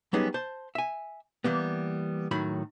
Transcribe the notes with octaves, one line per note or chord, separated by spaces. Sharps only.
F#3 G3 B3 C#4 D#4 G#4
C5 A5
E5 G#5
E3 G3 A#3 B3
A2 D#3 F#3 B5